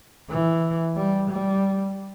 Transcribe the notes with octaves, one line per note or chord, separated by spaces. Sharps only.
E3
G3
G3